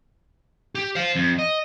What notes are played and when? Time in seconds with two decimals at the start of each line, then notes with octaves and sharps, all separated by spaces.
0.75 G4
0.95 C5 F5
1.16 F2
1.39 D#5